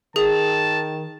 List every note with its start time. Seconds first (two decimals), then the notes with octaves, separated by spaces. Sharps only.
0.16 D#3 G#4 A5